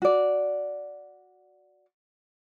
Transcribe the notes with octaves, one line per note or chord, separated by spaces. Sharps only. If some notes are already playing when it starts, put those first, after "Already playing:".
F#4 D5